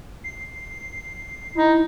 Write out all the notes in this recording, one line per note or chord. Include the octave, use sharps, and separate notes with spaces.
C7
D#4 E4